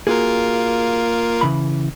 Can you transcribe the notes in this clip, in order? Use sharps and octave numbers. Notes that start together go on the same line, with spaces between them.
A#3 F4 F#4 G#4 A#4
C#3 E3 B5